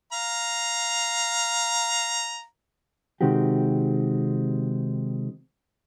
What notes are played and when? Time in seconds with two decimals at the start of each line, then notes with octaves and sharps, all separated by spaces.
0.12 F5 A#5
3.21 C3 D#3 G#3 C4 F#4 G4